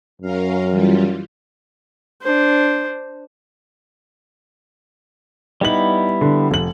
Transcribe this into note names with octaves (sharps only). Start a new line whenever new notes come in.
F#2 C#4 A#4 F5
E3 G3 F4
D4 C5
G3 B3 D#4 E4 F#7
D3
F1 F#7